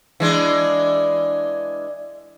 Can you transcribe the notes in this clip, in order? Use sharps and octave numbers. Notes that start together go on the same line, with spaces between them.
E3 G#3 D4